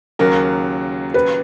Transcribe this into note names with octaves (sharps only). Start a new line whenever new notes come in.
D#2 C#3 F#3 A#4
B4